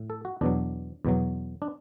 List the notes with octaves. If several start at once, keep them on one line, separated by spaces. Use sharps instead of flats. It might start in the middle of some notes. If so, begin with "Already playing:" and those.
Already playing: A2
A4
F#4
E2 B2 F#3 D4
E2 B2 F#3
D4